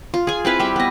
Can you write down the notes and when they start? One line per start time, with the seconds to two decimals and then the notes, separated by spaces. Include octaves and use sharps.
0.14 F4
0.27 G#4 G#5
0.45 C4 E4 B4 F5
0.60 G3 G4 E5
0.76 B3 D#5